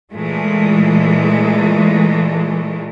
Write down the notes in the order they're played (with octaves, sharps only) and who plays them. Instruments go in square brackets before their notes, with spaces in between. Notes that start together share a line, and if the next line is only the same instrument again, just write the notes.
[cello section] A#2 E3 G#3 A3